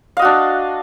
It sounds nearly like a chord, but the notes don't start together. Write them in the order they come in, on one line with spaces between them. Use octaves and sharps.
F5 D#5 F#4 D4